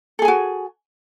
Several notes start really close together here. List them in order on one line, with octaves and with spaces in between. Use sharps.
A4 G#4 G#5 F#4